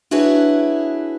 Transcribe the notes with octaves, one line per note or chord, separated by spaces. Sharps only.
D4 E4 F#4 G#4 B4 C#5